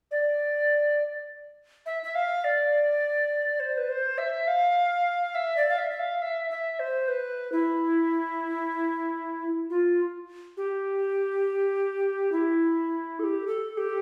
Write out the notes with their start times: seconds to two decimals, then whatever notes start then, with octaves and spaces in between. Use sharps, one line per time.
0.11 D5
1.86 E5
2.03 E5
2.15 F5
2.44 D5
3.60 C5
3.77 B4
3.89 C5
4.18 E5
4.47 F5
5.35 E5
5.57 D5
5.69 F5
5.78 E5
5.91 E5
5.99 F5
6.22 E5
6.50 E5
6.79 C5
7.08 B4
7.52 E4
9.70 F4
10.57 G4
12.32 E4
13.19 A4
13.24 G4
13.47 A4
13.78 G4